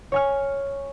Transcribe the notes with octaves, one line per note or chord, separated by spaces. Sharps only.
C#5 G#5 F6